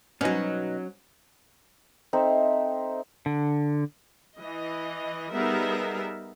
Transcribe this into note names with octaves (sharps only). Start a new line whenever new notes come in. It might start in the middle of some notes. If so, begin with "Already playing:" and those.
B2 F#3 B3 C#4 D#4
C4 D#4 A4 E5
D3
E3 D#5
G3 B3 D#4 G#4 A#4 E5